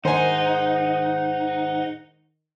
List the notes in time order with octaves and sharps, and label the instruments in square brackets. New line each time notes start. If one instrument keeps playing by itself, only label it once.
[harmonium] G#2 F#5 [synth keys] D#3 [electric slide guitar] D#4 [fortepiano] C5 G#5